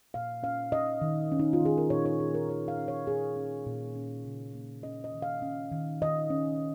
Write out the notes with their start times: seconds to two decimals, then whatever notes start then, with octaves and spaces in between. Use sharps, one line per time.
0.14 A#2 F5
0.43 C#4 F5
0.72 C#4 D#5
1.02 D#3
1.32 C#4
1.39 D#4
1.53 F4
1.60 D#3
1.65 G#4
1.78 A#4
1.90 A#2 C#5
2.06 C#5
2.20 C#4 G#4
2.35 A#4
2.49 D#3 C#5
2.68 F5
2.78 C#4
2.88 C#5
3.07 A#2 G#4
3.36 C#4
3.67 A#2
3.95 C#4
4.25 C#3
4.54 A#3
4.83 C#4 D#5
5.04 D#5
5.13 D#3
5.22 F5
5.42 C#4
5.72 D#3
6.02 D#3 D#5
6.30 C#4